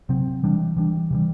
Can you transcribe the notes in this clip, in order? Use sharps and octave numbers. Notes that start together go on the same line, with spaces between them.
C3 F#3 C4
E3 G3 D4
E3 G3 D4
C3 E3 G3